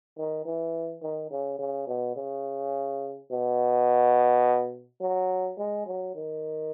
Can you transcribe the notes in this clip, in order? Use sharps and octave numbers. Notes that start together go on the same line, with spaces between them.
D#3
E3
D#3
C#3
C#3
B2
C#3
B2
F#3
G#3
F#3
D#3